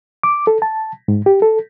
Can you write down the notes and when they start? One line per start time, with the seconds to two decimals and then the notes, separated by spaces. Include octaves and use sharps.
0.23 D6
0.47 A4
0.62 A5
1.08 G#2
1.26 G4
1.42 A4